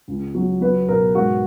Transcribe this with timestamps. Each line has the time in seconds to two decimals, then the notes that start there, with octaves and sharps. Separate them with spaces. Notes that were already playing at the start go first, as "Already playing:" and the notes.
0.08 C#2
0.35 F#3
0.61 F#3 B4
0.88 B2 A#4
1.15 G#2 F#4